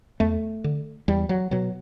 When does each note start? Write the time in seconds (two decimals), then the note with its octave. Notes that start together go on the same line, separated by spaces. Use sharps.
0.20 E2 A3
0.64 D3
1.08 E2 G3
1.29 F#3
1.51 B2 F#3